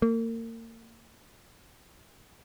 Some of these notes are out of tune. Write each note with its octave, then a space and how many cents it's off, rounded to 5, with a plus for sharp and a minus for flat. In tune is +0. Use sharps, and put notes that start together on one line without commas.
A#3 -35